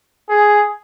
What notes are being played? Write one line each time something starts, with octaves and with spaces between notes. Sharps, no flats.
G#4